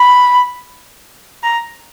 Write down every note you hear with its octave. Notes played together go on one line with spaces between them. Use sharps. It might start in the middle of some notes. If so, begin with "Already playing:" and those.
Already playing: B5
A#5